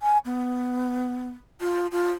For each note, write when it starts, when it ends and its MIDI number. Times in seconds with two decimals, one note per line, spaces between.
0.02 0.18 80
0.25 1.28 59
1.61 1.87 65
1.92 2.11 65